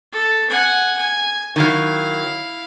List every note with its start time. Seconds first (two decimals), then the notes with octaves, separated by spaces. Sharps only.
0.12 A4
0.49 F#5 G#5
0.97 G#5
1.56 D#3 F#3 E4 F5